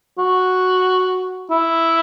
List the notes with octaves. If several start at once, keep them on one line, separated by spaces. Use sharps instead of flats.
F#4
E4